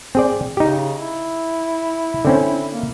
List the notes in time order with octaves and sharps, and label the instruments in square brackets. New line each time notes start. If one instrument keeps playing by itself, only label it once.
[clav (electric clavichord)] C4 G#4 D5
[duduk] C#3 [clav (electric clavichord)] D#4 G4
[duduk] E4
[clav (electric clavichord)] D3 C4 C#4
[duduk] A#3